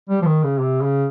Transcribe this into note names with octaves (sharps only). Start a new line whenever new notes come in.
G3
F3
D#3
C#3
C3
C#3